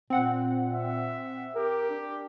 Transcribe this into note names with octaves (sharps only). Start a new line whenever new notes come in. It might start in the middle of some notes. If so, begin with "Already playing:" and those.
A#2 C4 F#5
E5
G4 A#4
D4